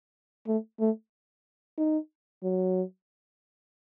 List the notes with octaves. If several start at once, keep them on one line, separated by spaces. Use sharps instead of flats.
A3
A3
D#4
F#3